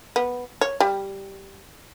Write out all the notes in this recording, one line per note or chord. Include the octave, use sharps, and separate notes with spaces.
B3
C#5
G3